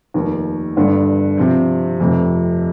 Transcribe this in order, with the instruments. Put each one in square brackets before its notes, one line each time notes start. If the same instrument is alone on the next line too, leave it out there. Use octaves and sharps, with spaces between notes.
[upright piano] F1 D#2 D#3
G1 G2 D3
C3 F3 C4
F1 F2 C3